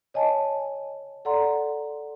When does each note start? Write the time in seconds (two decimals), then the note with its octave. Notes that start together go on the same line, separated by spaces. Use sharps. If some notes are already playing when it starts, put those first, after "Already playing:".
0.14 C#5 D#5 G#5 A5
1.25 A4 D5 F#5 A#5 C6